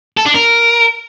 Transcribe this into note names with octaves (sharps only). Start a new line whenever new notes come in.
A4
D4
A#4